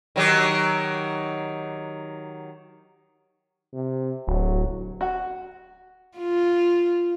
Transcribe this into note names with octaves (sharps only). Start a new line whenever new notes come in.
D#3 F#3 G4
C3
D1 F#3
F#4
F4